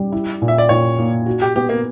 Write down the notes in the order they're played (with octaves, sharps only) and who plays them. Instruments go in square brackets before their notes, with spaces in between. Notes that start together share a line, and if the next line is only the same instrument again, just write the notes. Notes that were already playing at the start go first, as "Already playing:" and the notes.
Already playing: [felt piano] G3
E4
A#2
[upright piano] E5
D5
[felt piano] A#2 [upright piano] C#5
[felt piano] A#3
F#4
[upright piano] G4
[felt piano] B3 [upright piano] G4
[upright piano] A#3